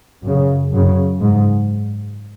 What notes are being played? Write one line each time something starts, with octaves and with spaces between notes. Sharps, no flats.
F#2 C#3
F#2 C#3
G#2